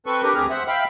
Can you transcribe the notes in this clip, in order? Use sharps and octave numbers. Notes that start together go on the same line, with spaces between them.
C4 A4 B4 C#6
D4 G4 A#4 B4
D2 C4 G4 G#4 F6
C5 E5 F#5
E5 F5 G5 B5